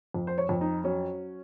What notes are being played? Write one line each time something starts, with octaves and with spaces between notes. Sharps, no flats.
F2
C5
C#5
F2
D#4
F#3 C#4